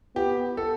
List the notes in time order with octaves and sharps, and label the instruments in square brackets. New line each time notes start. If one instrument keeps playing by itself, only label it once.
[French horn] B3 [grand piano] G4
[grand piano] A4